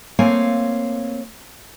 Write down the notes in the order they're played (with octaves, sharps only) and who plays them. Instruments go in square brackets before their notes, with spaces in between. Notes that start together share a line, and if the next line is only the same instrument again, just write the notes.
[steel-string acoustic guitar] A3 A#3 C4 C#5 F5 G#5